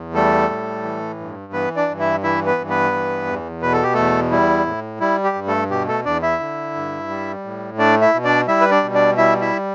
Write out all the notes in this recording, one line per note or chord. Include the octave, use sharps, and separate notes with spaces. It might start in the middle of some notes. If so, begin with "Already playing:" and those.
Already playing: E2
G3 A3 A4
A2
E3
G2
E3 B3 B4
D4 D5
G2
E4 E5
E3 E4 E5
B3 B4
G2
B3 B4
E3
E2
B2 B4
A4
G4
E2 A3 A4
G3 E4
A2
G3 E4
G4
G2
A3 A4
B2 G4
A3 A4
E2 D4 D5
E4 E5
D3
G2
G3
A2
A3 D4 D5
E4 E5
B2
D4 D5
G3 E4 E5
B4
D4 D5
B2
D4 D5
G3 E4 E5
E4 E5